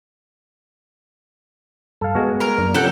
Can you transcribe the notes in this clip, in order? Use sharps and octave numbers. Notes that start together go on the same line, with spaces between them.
G2 A4 F5
G#3 B3 F#4
A#4 A#5
F#2 A#3 D4
C3 F3 C#4 A4 F#5 G5 G6